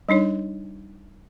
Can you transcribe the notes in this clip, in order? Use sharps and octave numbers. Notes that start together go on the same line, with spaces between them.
G3 D4 D#4 C#5